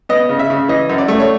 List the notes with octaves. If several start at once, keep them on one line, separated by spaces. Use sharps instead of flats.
B3 D#5
C#3
E5
C#3
E3 D#5
F#2
D5
A3
C#5